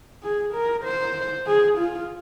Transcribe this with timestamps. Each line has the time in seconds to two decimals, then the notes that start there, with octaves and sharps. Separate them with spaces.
0.23 G#4
0.54 A#4
0.85 C5
1.47 G#4
1.78 F4